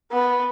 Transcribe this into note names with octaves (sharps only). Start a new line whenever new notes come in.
B3